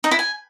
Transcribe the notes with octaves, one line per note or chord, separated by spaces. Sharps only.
D#4
E4
G#5